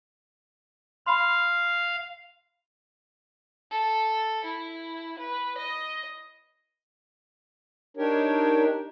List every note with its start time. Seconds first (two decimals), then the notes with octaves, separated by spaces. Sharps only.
1.06 F5 B5 C6
3.71 A4
4.44 E4
5.19 B4
5.58 D#5
7.97 D4 D#4 G4 A#4 C#5